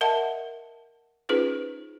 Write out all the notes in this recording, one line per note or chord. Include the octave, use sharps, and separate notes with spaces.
A#4 D#5 E5 F#5 A5
C#4 D#4 F4 G#4 B4 C5